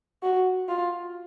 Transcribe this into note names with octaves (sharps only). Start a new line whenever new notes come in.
F#4
F4